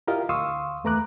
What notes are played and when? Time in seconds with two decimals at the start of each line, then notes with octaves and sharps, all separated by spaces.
0.07 E4 F4 G4 A#4 D#5 F5
0.29 D2 F5 C6 C#6 D#6 E6
0.84 E2 A3 B4 A#5 D6 F#6